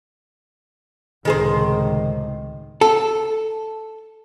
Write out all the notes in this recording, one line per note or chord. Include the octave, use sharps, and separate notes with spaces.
C#2 A2 C3 D#3 G#4 C5
A4